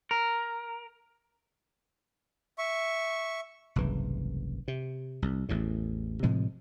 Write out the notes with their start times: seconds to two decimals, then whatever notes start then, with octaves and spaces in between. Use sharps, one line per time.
0.11 A#4
2.58 E5 C#6
3.76 F#1 C2 G#2 E3
4.68 C3
5.22 C2
5.49 A1 E2 A2
6.23 A2 C3 F3 G#3